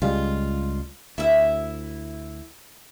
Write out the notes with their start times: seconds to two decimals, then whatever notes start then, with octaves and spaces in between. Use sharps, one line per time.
0.02 C#2 G3 G#3 F4
1.18 D2 E4 E5